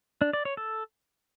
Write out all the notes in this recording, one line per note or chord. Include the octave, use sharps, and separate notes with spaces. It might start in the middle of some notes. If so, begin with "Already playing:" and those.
D4
D5
C#5
A4